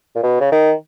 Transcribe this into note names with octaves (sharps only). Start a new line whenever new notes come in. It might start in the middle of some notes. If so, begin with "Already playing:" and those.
A#2
B2
C#3
D#3